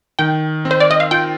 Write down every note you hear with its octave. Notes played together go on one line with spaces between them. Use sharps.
D#3 G5
C4
C5
D5
D#5
F5
F4 G5